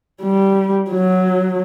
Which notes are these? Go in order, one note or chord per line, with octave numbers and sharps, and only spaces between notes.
G3
F#3